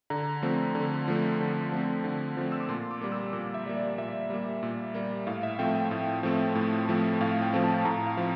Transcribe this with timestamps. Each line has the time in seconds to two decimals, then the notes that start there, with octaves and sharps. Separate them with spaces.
0.10 D3 A#5
0.42 F3 A3 C4
0.75 D3
1.08 F3 A3 C4
1.40 D3
1.72 F3 A3 C4
2.04 D3
2.37 F3 A3 C4
2.52 E6
2.60 D6
2.69 A#2 C6
2.91 D6
3.01 G3 A#3
3.12 E6
3.33 A#2 D6
3.54 E5
3.66 G3 A#3
3.77 D5
3.98 A#2 E5
4.30 G3 A#3
4.63 A#2
4.94 G3 A#3
5.27 A2 F5
5.43 E5
5.59 F3 A3 C4 G5
5.75 G5
5.91 A2
6.23 F3 A3 C4
6.55 A2
6.89 F3 A3 C4
7.21 A2 F5
7.42 G5
7.53 F3 A3 C4
7.64 A5
7.85 A2 A#5
8.07 F5
8.17 F3 C4